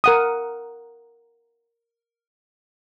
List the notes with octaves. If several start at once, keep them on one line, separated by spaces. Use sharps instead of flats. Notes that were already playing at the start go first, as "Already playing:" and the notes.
A#4 F#5 D#6